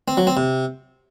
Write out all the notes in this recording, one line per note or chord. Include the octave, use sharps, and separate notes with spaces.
C4
F#3
C4
C3